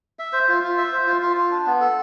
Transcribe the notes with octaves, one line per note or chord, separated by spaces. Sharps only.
E5
C5
F4
F4
E5
C5
F4
F4
F4
D4
B3
A4